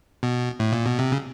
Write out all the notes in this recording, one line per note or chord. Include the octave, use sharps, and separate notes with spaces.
B2
A2
A#2
B2
C3
C#3